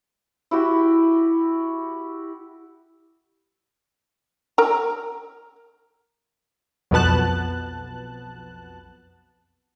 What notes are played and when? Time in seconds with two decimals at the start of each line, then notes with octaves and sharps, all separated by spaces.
0.51 E4 F#4 G4
4.58 A#4 A#5
6.91 B1 F2 B2 B3 A5 F#6